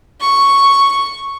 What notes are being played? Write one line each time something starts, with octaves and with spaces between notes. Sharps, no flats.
C#6